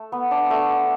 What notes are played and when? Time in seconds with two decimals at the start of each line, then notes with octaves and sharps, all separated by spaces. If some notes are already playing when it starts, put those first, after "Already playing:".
Already playing: A3
0.12 B3
0.31 D4
0.50 A3